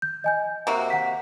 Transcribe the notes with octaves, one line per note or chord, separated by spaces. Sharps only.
G6
D#5 G#5 G6
C3 A#3 F#4
F#5 B6